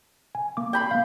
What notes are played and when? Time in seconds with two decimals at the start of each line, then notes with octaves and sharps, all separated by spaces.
0.35 G#5
0.57 A#3 D6
0.73 G5 B5 C6
0.91 A#3 F5